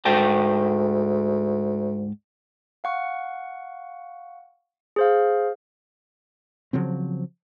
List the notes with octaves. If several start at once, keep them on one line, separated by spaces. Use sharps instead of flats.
D2 G#2 G5 A5
F5 F#5 C#6
G#4 C5 F5
C#3 F3 F#3 C4